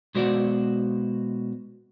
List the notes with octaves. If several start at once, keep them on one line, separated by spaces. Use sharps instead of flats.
B2 G#3 F#4 C5 D5